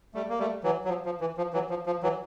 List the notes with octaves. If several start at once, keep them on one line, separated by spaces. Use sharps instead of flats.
G3 A3
A#3
G3 A3
E3 F#3
F#3
F3
F3
E3
F3
E3 F#3
F3
F3
E3 F#3